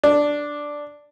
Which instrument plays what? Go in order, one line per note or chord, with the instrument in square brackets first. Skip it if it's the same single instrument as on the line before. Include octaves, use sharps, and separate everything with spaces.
[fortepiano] D4